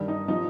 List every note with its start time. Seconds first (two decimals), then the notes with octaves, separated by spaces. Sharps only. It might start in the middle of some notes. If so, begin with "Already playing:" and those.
Already playing: G2 D#3 G3
0.08 D#4
0.28 F3 D#4